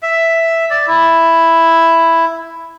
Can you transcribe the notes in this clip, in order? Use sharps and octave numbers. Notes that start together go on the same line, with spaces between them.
E5
D5
E4